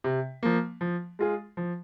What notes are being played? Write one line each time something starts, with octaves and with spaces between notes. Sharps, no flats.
C3
F3 A#3
F3
G#3 F4 G#4
F3